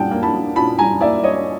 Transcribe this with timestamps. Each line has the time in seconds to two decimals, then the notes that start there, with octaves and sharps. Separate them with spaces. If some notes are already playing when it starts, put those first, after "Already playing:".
Already playing: A#2 G3 F#5 G5 A5
0.11 A#3
0.23 A5 B5
0.34 D4
0.56 A#2 A5 B5
0.79 G3 G#5 A#5
1.01 A#3 D5 E5
1.23 D4 C#5 D#5